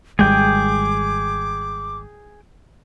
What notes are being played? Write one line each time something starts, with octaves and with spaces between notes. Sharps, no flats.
G#1 G3 G#3 G#4 G5 D6